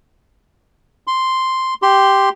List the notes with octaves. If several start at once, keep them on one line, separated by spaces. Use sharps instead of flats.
C6
G4 C6